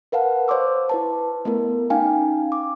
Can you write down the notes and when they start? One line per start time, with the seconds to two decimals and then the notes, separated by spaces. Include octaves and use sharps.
0.12 A#4 B4 F5 F#5 A5
0.48 C5 C#5 C6 D6 E6
0.89 E4 B4 A5
1.45 A3 B3 E4 A#4
1.90 C#4 D#4 F5 G5 G#5
2.52 D6